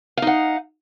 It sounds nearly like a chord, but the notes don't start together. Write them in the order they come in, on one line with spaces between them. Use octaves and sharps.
F5 D#4 F#5